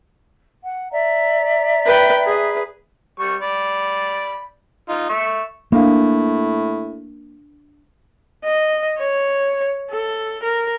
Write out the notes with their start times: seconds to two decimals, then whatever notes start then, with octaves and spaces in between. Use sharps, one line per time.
0.63 F#5
0.91 D5 E5 A#5
1.86 B4 G5
2.26 G#4 B4
3.19 G3 C#6
3.41 D5 B5
4.89 D#4 F4
5.09 E5 C#6
5.72 A2 A#3 D4 A#4 F5
8.44 D#5
8.99 C#5
9.91 A4
10.43 A#4